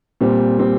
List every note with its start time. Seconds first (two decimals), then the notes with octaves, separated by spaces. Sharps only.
0.21 A#2 G3 C4
0.59 A#2 G3 C4